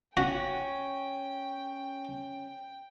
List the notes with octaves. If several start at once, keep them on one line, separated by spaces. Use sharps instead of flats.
C#4 F#4 G5